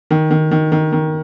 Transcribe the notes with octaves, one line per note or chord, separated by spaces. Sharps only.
D#3
D#3
D#3
D#3
D#3